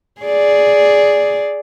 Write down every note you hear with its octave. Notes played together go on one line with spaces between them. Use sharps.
G#4 D5